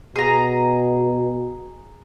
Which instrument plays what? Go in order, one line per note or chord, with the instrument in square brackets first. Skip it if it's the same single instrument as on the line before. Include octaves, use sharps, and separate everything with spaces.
[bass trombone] B2 [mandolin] G#4 A#5